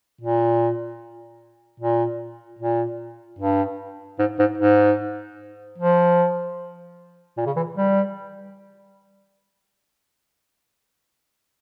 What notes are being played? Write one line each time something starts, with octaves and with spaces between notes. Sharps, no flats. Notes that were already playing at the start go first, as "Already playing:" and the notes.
A#2
A#2
A#2
G2
G#2
G#2
G#2
F3
A#2
C#3
E3
G3